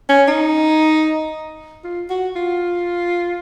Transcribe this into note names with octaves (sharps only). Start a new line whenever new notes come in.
C#4
D#4
F4
F#4
F4